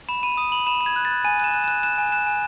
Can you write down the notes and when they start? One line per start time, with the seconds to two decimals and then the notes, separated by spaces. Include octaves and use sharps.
0.09 B5 E7
0.23 B5 D#7
0.37 D#6 D#7
0.52 B5 F#7
0.67 B5 E7
0.81 B5
0.86 G#6
0.96 F#6
1.05 A6
1.11 F#6
1.24 G#5 D#7
1.40 F#6 E7
1.54 F#6
1.64 F#6 E7
1.83 F#6 E7
1.98 G#5
2.12 F#6 E7
2.26 G#5